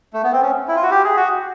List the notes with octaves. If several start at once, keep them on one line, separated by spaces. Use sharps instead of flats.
A3
B3
C4
C#4
E4
F4
F#4
G4
G#4
F#4